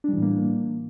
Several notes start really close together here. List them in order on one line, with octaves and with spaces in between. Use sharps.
D4 G3 E3 A2 A#3